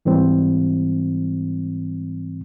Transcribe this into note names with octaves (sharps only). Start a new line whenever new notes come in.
G#2 E3 G3 C4